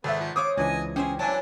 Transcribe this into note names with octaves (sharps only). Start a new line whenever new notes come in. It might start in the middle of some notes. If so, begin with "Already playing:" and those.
G#1 A3 B3 E5
F3
C5 C#5 F5 D6 D#6
C#2 E3 D4 D#5 G#5
C#4 G4 G#4 C5 E5
E3 F#3 D4 G#5 A5